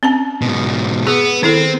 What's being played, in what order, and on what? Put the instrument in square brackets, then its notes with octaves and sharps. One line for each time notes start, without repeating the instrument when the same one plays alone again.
[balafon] C4 C#4 A#5
[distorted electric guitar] G#2 B2
[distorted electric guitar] B3 [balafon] G#4 B4
[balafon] D#3 E4 A4 [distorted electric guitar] C4